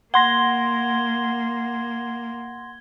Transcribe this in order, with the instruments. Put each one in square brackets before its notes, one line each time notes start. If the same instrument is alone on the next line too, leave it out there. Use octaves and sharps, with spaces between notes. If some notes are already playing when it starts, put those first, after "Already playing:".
[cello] A#3 [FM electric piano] F#5 C6 A#6 [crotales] G#6 G7